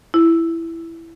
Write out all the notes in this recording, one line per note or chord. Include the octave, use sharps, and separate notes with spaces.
E4